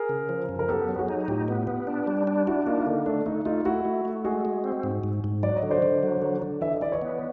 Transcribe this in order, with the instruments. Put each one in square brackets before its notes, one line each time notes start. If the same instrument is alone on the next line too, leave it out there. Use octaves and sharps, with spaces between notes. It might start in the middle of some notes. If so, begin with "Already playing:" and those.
Already playing: [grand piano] G#4 A#4
[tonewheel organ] C#3
F3
F#2
[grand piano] A#4
[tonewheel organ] B3 [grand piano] G4 A4
[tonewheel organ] F#3
[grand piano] F#4 G#4
[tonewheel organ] D#4
[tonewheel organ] A2 [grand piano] F4 G4
[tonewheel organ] B3
B3
D4
G3
D4
[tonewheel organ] D4 [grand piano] E4 F#4
[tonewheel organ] A#3 [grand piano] D#4 F4
[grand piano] E4
[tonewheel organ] D3 [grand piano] D#4
[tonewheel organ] A3 [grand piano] D4
[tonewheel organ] A3 [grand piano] D#4
[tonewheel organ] A3 [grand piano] D#4 F4
[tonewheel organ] A3 [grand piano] E4 F#4
[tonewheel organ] A3
A3
[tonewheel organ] G#3 [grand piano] F#4 G#4
[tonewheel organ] G#3
C4
G#2
G#2
G#2
[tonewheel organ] F#3 [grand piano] D5
[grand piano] D#5
[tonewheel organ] D3
[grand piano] C5 D5
[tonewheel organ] D3
F#3
D3
D3
[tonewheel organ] E3 [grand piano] E5
[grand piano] D#5
[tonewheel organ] E3 [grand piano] D5
[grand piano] C#5 D#5
[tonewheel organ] B3